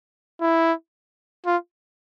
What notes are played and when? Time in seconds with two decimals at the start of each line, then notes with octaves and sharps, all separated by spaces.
0.41 E4
1.46 F4